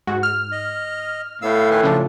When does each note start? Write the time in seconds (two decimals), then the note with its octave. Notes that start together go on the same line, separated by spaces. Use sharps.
0.07 G#2 F#4
0.23 F6
0.52 D#5
1.42 A2 B3 F5 E6
1.70 D#3 B4 G#5
1.83 C#3 F3 D4